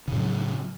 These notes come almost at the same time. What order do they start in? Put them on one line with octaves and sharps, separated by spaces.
C#3 A2 F#3